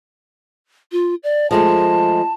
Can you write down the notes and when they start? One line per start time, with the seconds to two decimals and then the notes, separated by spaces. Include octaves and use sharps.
0.92 F4
1.24 D5
1.51 F3 G#3 A3 A5